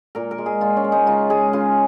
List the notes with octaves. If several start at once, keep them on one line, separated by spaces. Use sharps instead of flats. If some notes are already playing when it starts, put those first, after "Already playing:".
A#2 A#4
A#4
G#3
G#4
A#2 F4
C#4
G#3
D#4
C#3 F4
G#3 G#4
C#3 F4